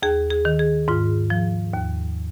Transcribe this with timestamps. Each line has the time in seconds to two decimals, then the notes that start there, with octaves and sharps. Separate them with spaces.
0.02 D#2 G#4
0.30 G#4
0.45 D#3
0.59 G#4
0.88 G#2 F4
1.30 F3
1.73 D#2